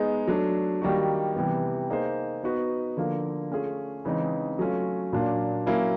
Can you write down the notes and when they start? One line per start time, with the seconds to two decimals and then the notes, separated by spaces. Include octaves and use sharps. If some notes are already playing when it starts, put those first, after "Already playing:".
Already playing: G#3 B3 D#4 G#4
0.28 F#3 A3 D4
0.82 D#3 G3 A#3 D#4 F#4
1.35 C3 E3 G3 B3
1.90 A#3 D#4 G#4 C5
2.43 B3 D#4 F#4 B4
2.97 D3 F3 A#3
3.51 A3 C#4 F4 G#4
4.05 C#3 E3 G#3 C4 D#4
4.59 F#3 A3 C#4 F4
5.13 A#2 F#3 A#3 D4 F4
5.67 F#3 A#3 C#4 E4